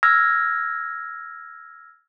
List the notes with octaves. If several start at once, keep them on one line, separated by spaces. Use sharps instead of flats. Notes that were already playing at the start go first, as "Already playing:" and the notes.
E6 F6 G#6 A#6